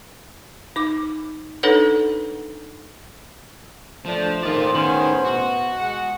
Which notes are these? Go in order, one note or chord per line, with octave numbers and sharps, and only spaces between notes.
D#4 D6
D4 D#4 A4 B4 C#5 F#5
F3 A3 D4 F4 C5
A1 A2 D#3 F4 G#4 C5 D5
D#3 B3 C#4 C6 F#7
B2 F#4
G#3 F#5